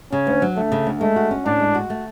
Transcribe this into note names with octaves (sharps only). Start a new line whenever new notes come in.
C#3 C#4
D2
F#3
D2 A3
C#3
D2
G#3 A3
F#4
C#4
A2 D4
G#3
F#4
A3